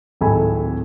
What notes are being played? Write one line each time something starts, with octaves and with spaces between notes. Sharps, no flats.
D1 G#1 A4 G#5 B5